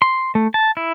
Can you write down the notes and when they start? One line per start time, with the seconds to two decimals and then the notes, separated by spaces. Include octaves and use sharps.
0.02 C6
0.35 A3
0.54 A5
0.77 E4